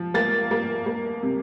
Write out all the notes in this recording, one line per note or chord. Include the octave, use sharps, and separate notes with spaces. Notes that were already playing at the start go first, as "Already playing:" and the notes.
Already playing: F3
A#3 A6
A#3
A#3
C3